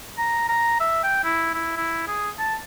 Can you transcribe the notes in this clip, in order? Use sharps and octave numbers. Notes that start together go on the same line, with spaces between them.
A#5
A#5
E5
G5
E4
E4
E4
G#4
A5